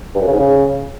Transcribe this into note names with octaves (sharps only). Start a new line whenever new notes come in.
G2
F#2
C#3
G#2
C#3